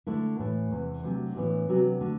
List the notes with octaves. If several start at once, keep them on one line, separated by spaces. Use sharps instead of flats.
D3 A3 E4
A2 E3 A3
E2 C3 E3
C3 F#3 A3 D4 F#4
A2 E3 B3 D4
C3 F#3 B3 D4 F#4
D3 A3